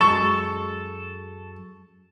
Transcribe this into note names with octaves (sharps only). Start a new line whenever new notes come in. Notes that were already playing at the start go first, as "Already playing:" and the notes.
F#2 G#3 A4 C#6